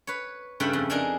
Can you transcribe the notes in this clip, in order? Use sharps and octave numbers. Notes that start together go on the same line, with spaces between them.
B4 C#5
G2 C#3 A3 E4 B4 G5
F2
D4 D#4 G#4 A#4